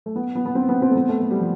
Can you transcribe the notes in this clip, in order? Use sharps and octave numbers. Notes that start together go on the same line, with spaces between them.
A3
B3
B3
B3
C4
B3
C4
A3
B3
A3
A3
G3
F3